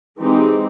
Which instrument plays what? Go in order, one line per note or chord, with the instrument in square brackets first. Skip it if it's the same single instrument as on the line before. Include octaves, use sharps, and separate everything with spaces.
[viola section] E3 G#3 C4 D#4 G4